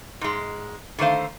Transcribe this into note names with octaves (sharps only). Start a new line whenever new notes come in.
G#2 G#3
D3 D#3 A3 C5 F5